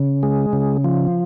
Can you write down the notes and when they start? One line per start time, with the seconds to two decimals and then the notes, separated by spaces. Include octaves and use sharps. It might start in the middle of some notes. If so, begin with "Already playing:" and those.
Already playing: C#3
0.23 G#3
0.53 C#3
0.84 F3